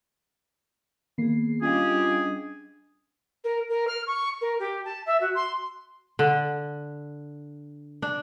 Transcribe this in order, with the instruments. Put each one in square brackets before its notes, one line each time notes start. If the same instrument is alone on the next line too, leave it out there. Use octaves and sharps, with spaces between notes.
[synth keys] D#3 A#3 C7 [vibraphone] B3 G#4
[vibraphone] G3 D4 D#5 [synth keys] C#4 [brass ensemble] F4 G4 [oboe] G#4
[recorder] A#4
A#4
F6
C#6
A#4
G4
A5
E5
F#4
C6
[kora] D3
D4